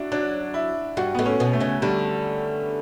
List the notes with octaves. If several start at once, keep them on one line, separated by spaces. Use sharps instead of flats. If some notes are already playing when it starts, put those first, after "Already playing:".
Already playing: D4 E4 F#4
F#3 D4
E4
G2 G3 F#4
A2 A3 B3
C#4
B2 B3
A3
C#3 C#4
D3 G3 D4